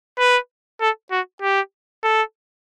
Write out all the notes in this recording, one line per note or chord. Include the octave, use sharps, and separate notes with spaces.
B4
A4
F#4
G4
A4